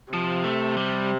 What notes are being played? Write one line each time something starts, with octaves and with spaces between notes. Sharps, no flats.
C3 F3
A3
G3